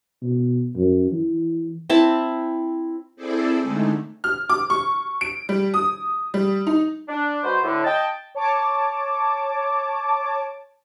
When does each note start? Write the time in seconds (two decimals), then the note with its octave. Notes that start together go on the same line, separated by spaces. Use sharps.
0.22 B2
0.76 F#2
1.11 E3
1.90 C4 E4 A5
3.16 C4 E4 G#4 A4 C5 D5
3.62 D3 G#3 A3 D#4
4.24 F6
4.49 D6
4.70 C#6
5.21 D7
5.49 G3
5.74 D#6
6.34 G3
6.67 D#4
7.09 D4
7.44 G#3 F#4 B4 C5
7.64 A2 D3
7.84 D#5 G5 A5
8.35 C#5 A5 D6